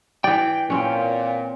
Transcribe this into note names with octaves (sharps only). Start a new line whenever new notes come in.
E3 D5 G5
A#2 C4 C#4